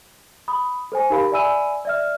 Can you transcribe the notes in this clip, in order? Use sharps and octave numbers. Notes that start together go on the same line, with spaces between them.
B5 D#6
A4 C5 G#5
D#4 G4 A#4 F5 B5
D5 E5 G#5 B5 E6 D#7
D5 E5 F6